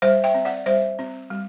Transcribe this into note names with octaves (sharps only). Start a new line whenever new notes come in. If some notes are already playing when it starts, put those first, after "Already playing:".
G3 C5 E5
E5 G5
C4
D5 F#5
G3 C5 E5
C4
G3